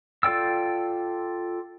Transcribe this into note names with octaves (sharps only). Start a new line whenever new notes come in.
F4 A4 D5 G5 E6